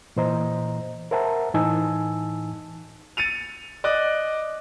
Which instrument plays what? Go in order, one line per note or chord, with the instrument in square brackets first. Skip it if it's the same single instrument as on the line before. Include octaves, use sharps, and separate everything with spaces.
[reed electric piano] A#2 E3 C5 D#5 A#5
A#4 C5 E5 F#5 A5 A#5
A2 E3 D#4 G#5 A5 E6
[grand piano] A6 C#7 D#7 F7
D5 D#5 D6 F#6